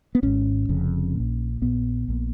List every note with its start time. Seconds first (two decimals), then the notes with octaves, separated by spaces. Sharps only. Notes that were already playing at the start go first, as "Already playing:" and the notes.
0.15 B3
0.23 G#1 G#2 C#4
0.69 F1 F2 C#3
1.15 A#2
1.20 A#1
1.61 A#1 A#2 B3
2.08 A#1 A#2